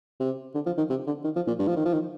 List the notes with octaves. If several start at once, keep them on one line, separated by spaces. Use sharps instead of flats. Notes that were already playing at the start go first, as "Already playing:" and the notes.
C3
D3
F3
D#3
C3
D3
D#3
F3
A#2
G2
F3
D#3
F3
D#3